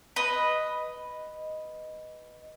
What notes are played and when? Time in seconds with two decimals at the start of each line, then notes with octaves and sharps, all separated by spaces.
0.16 B4 D#5